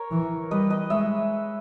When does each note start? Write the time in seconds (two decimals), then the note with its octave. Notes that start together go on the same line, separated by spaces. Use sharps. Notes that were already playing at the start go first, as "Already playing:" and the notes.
Already playing: A#4 C#5
0.11 E3
0.51 G3 B4 D#5
0.70 B4 D#5
0.90 G#3 C#5 E5